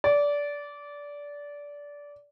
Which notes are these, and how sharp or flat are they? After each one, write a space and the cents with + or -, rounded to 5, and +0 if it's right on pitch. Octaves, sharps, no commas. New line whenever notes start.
D5 -20